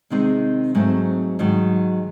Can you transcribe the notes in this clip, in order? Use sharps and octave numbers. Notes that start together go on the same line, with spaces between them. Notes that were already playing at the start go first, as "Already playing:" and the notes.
C3 D#3 G#3 C4 D#4
G#2 F#3 A3 C4
G#2 D#3 F#3